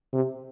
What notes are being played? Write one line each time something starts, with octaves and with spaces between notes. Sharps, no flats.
C3